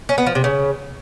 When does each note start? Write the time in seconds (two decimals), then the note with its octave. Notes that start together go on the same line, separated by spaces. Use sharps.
0.09 C#4
0.18 B3
0.26 F3
0.35 C3
0.44 C#3